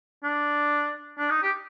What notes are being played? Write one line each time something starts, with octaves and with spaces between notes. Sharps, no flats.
D4
D4
D#4
G4